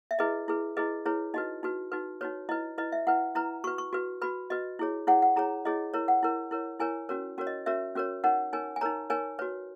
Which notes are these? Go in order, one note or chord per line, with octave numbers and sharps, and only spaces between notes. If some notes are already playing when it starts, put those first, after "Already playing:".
E5
E4 G#4 B4 D#5
E4 G#4 B4
E4 G#4 B4 D#5
E4 G#4 B4 C#5
D#4 F#4 B4 D#5
D#4 F#4 B4
D#4 F#4 B4
D#4 F#4 B4 C#5
E4 B4 D#5
E4 B4 D#5
E5
E4 B4 F#5
E4 B4 A#5
F#4 B4 C#6
C#6
F#4 B4
F#4 B4 B5
F#4 B4 D#5
E4 G#4 C#5
E4 G#4 C#5 F#5
F#5
E4 G#4 C#5 A#5
E4 G#4 C#5 D#5
E4 A#4 C#5
F#5
E4 A#4 C#5
E4 A#4 C#5
E4 A#4 C#5 G#5
C#4 F#4 A#4 C#5
C#4 F#4 A#4 C#5
D#5
C#4 F#4 A#4 C#5 E5
C#4 F#4 A#4 C#5
D#4 A#4 C#5 F#5
D#4 A#4 C#5 G#5
G#5
D#4 A#4 C#5 A#5
D#4 A#4 C#5 G#5
F#4 B4 C#5